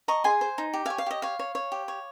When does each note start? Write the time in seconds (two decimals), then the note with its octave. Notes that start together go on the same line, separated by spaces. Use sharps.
0.08 D#5 A#5 C#6
0.24 G#4 G#5 C6
0.41 C5
0.58 D#4
0.73 G4
0.86 C#5 F5 G#5
0.98 F5
1.06 G4 D#5
1.22 C#5 F5
1.39 C#5
1.55 C#5
1.72 G4
1.88 C#5